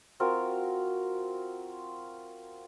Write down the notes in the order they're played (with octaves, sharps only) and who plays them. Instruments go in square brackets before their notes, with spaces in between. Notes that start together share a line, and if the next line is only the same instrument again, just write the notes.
[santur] C4 F4 F#4 A#4